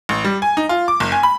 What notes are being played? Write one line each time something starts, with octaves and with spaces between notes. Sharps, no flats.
A1
G3
G#5
D#4
F4
D6
F#1
G#5
B5